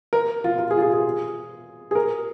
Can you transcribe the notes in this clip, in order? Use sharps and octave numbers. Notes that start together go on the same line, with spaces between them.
A#4
F4
F4
G#4
F4
G#4
G#4
G#4
A#4